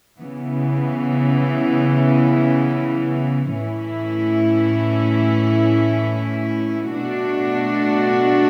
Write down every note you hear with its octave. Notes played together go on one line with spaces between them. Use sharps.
C#3 E3 B3
A2 E3 A3 C#4 E4
B2 A3 D4 F#4